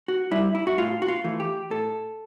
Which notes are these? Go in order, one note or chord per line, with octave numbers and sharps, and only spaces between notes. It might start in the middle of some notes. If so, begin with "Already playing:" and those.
F#4
G3 E4
E4
F#4
A2 F4
F#4
F4
E3 A3
G4
A2 A4